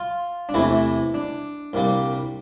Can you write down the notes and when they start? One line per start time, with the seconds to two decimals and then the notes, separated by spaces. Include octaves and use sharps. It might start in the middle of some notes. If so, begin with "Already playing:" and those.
Already playing: F4
0.49 D4
0.54 E2 C3 E3 A3 E4
1.14 D4
1.73 C2 A#2 G3 A#3